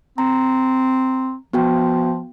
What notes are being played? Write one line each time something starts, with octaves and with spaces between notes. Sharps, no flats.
C4 A#5
F3 B3 F#4 G5